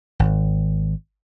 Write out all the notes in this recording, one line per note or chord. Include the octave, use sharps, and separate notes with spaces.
G#1